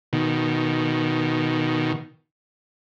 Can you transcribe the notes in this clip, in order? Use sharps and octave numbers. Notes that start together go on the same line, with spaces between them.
B2 D#3